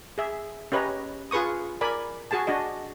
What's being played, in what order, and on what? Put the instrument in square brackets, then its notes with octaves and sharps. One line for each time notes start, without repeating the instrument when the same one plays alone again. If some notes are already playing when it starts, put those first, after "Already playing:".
[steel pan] G#4 E5
C#4 G4 B4 C#5 D#5 A#5
F4 G#4 B4 C#6 D#6
A#4 D5 G#5 B5
F#4 G#4 G#5 A5
D4 F#4 D#5